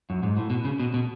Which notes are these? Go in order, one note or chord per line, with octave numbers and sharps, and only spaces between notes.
F#2
G#2
A2
B2
C#3
B2
B2